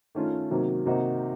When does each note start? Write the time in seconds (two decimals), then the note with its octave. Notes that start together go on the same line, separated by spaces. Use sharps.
0.15 D#3 A3 C#4 F4
0.51 C3 D#3 F#3 A#3
0.86 C3 D#3 A#3 D#4 F#4